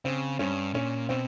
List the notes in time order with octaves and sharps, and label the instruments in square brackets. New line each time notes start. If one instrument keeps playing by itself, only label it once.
[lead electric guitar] C#3 [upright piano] C4
[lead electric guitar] G2 [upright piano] C#4
[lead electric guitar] A#2 [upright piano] C#4
[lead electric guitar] B2 [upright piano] C4